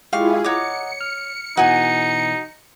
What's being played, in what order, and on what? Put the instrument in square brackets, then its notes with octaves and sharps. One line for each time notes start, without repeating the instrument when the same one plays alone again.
[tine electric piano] G#3 G4 C#6 [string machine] E4 F4 G#4 [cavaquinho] F5
[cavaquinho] C#5 D6 [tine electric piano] D#5 F#5 A#5 [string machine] C#7
[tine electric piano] F6
[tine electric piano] B2 E3 [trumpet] D#4 [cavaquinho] F#4 G#5